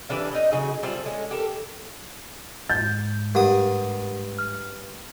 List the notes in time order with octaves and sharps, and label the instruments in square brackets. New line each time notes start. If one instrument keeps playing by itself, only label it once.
[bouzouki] E3 G3 D4 F5
D#4 D#5 F5
C#3 F#3 D#4 G#4
G3 A3 C4 F4
G#3 C#4
G4 A4 A#4
[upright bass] G#2 [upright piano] G6 [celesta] A6
[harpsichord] G2 D#6 [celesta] G4 A#4 F#5
[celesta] F6